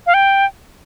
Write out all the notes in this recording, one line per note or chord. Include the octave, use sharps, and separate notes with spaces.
F5
G5